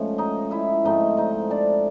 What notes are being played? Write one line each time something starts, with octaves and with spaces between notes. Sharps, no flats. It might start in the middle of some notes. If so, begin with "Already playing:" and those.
Already playing: G#2 F3 A3 C#4
D#4 D#5
E4 E5
G#2 F3 A3 C4 D#4 D#5
D#4 D#5
D4 D5